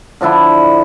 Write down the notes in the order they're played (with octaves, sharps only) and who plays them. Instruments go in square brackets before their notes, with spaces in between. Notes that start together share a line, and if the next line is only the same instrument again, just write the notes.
[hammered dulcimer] D3 F3 D4 E4